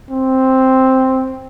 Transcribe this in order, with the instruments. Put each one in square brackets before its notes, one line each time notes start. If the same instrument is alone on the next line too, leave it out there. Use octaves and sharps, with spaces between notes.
[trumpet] C4